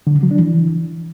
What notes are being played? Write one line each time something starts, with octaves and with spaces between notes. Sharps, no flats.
D3
C#3
F#3
D4
E3